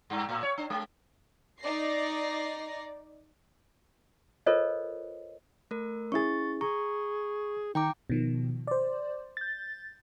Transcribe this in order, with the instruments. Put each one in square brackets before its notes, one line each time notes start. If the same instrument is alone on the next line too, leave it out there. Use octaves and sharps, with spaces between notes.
[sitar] G2
A2
C#5
D4
G#3
[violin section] D#4 D5 A#6 C7
[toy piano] F4 A4 A#4 C5 C#5 D#5
[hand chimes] A3 A#4
[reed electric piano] C#4 E4 G#4 [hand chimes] C#6 A6
[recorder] G#4 [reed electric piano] A#5 [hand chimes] C#6
[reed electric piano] D#3 [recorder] D#4 [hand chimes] G5 A#5 D6
[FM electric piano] B2 D#3 F3
C5 D5
G6 A6